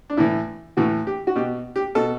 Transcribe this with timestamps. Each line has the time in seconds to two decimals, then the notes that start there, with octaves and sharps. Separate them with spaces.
0.10 D4
0.17 A2 E3 E4
0.77 A2 E3 F#4
1.07 G4
1.27 F#4
1.36 B2 G4
1.76 G4
1.95 B2 A4